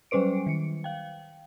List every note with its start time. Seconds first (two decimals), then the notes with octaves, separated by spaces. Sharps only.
0.11 F#3 G3 C#4 B4 C5 D7
0.47 D#3 C#7
0.84 F5 G5